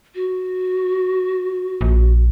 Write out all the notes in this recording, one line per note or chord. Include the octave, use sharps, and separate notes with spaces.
F#4
A#1